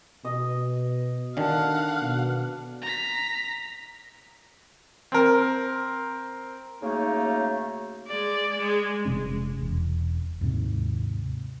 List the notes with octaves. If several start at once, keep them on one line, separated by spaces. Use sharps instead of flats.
B2 D#5
D3 D#3 D4 A4 F5 F#5
B2
A#5 B6
C4 A#4
C#3 F#3 A3 A#3 D#4
G#3 D5
G#3
F1 C3 G#3 C#4
E1
D#2 G#2 C3